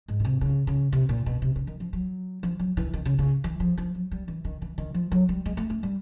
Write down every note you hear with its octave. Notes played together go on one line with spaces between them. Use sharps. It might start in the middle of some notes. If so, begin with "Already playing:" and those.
G#2
B2
C3
C#3
C#3
C3
A#2
B2
C3
C#3
D#3
F3
F#3
F3
F#3
E3
D#3
C#3
C#3
E3
F3
F3
F#3
G3
E3
D#3
E3
D#3
F3
F#3
G3
G#3
A3
A3
G3